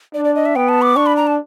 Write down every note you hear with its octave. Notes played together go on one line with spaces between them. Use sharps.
D4 D5
D5
D#5
E5
B3 G5
A5
D6
D4 C#6
B5
A#5
A5